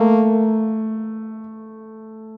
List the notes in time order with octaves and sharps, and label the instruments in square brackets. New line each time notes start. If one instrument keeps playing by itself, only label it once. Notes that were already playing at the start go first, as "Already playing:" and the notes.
Already playing: [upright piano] A3 [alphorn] A#3